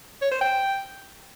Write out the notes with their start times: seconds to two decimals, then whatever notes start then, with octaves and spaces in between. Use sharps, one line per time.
0.22 C#5
0.31 C5
0.41 G5